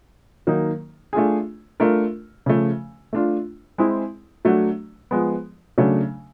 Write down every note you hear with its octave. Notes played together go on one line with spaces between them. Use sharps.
D#3 F#3 A#3 D#4
A3 D4 F4 G#4
A3 D4 F4 A#4
C#3 F3 A3
A3 D4 F4
G#3 C4 E4 G#4
F#3 A3 D4 F#4
F3 G#3 B3
C#3 F#3 A3 D4